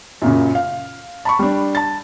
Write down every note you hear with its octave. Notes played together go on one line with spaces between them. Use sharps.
F#2 A#2 C#3
F5
A5 B5 C#6
G3 D4
A5 A6